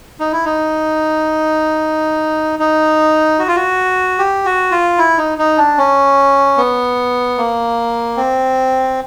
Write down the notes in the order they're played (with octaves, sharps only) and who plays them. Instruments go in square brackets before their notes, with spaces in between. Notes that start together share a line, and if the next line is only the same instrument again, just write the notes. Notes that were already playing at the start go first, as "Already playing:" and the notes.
[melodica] D#4
E4
D#4
D#4
F#4
F4
F#4
G4
F#4
F4
E4
D#4
D#4
D4
C#4
B3
A#3
C4